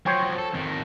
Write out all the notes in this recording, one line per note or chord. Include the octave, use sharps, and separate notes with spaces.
F3 F#3 C5 C#5 G5
A4
F2 D#3